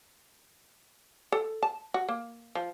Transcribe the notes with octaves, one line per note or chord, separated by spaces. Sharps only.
A4
A5
F#4
A#3
F3